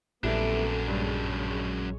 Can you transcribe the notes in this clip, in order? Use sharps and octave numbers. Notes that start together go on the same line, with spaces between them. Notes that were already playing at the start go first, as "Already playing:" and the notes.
A#1 F#2 G3 A3 B3 D4 E4 A4
G2 G#3 C#5